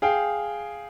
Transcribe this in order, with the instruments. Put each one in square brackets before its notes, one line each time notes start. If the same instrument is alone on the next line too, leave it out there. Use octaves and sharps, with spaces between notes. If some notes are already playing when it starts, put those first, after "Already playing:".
[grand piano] G#4 F5 G5